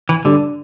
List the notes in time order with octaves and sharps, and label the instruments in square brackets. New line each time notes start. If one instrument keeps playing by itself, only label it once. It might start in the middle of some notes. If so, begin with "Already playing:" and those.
[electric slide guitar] E3
[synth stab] G2 G3 D4 [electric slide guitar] D3